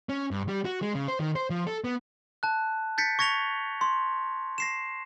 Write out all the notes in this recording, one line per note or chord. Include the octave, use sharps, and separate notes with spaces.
C#4
G2
G3
F#4
G#3
C#3
C5
D#3
C5
F3
A4
B3
A5 F#6
G6 A6 B6 C#7
C#6 G#6 A#6 C#7 F7 G7
C6
A#6 C7 E7